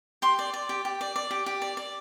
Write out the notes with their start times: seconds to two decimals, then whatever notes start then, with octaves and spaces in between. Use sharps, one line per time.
0.22 G4 C6
0.39 D5
0.54 D5
0.69 G4
0.85 G4
1.01 D5
1.16 D5
1.31 G4
1.46 G4
1.62 D5
1.77 D5